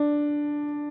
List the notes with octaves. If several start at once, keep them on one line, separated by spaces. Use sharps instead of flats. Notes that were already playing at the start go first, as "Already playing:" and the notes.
Already playing: D4